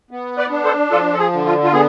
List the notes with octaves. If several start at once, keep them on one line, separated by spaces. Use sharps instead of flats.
B3
B4 D5
D4
A4 C5
F3 F4 A4
A4
G#4
D3
F4
F4
B3 G#4